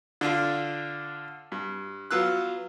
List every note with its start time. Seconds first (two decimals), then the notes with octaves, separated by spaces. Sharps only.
0.21 D3 D4 F4
1.52 G2
2.11 F#3 B3 F4 E6 F#6